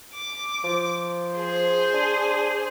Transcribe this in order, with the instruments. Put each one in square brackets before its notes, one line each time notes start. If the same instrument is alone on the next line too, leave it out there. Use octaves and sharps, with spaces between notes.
[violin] D6
[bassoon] F3
[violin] G#4 C5
[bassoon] D4